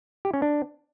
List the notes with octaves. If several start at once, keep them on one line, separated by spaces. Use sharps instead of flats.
G4
C#4
D4